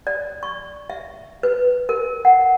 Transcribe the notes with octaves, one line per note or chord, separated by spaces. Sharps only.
D5
C#6
E5
B4
A#4
F#5